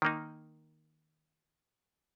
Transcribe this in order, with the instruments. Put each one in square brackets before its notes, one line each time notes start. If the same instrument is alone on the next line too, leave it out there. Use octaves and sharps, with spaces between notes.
[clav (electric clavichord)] D#3 A#3 D#4